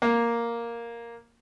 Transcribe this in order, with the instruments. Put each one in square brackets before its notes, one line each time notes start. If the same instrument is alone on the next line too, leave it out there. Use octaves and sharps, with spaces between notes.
[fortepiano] A#3